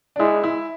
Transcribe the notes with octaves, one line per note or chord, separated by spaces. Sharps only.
D4
G#3 E4
E4